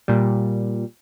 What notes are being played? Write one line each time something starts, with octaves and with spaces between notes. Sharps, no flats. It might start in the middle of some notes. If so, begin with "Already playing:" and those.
A#2 G3